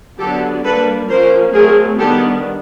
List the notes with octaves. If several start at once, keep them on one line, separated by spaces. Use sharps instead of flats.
D3 F#3 B3 D4 G4 A4
G3 A#3 D4 A4 B4
F3 A#3 C#4 A#4 C5
F#3 A3 C4 G#4 A#4
D#3 G3 B3 D4 G4 A4